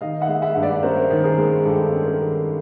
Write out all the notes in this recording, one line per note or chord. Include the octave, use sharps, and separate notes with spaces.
D#3 D#5 F5
E5 F#5
G#3
E5 F#5
G2
D5 E5
C#4 A#4 C5
D#3
G#4 A#4
G#3
G2 G4 A4
C#4
G#4 A#4
D#3